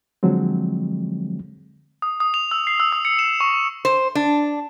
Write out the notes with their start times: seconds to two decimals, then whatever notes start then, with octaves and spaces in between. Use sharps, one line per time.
0.23 D3 F3 F#3 G#3 C4
2.02 D#6
2.20 D#6
2.34 F7
2.51 E6
2.67 C7
2.80 E6
2.92 D#6
3.05 C#7
3.19 E7
3.40 C#6
3.85 C5
4.15 D4